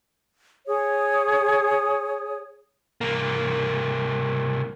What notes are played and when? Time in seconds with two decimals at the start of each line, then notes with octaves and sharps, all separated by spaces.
0.67 G#4 C#5 D#6
3.01 C2 A#3